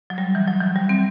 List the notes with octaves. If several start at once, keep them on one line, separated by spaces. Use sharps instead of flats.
F#3
G3
E3
F#3
E3
G3
C4